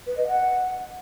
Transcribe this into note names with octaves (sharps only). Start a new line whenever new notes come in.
B4
D#5
F#5